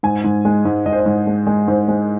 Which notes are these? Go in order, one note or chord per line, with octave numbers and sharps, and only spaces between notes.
G#2 G#5
G#2
G#3
G#2
G#2 D#5
C5
D#5
G#2
G#3
G#3
G#2 C5
G#3